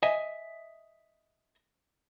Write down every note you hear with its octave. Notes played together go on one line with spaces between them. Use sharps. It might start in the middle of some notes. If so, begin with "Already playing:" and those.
D#5 E5 G#5